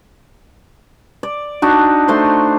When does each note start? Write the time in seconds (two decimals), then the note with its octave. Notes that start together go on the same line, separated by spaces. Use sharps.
1.23 D5
1.62 D4 D#4 F#4
2.08 A3 C5 C6